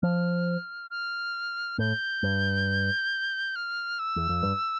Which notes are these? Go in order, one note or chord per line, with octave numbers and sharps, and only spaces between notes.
F3 F6
F6
A2 G6
G2
F6
E6
E2
F2
G2